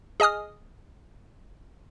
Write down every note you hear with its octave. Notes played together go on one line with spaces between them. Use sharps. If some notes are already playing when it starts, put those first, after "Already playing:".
G#4 D#5 G#5 D#6 F6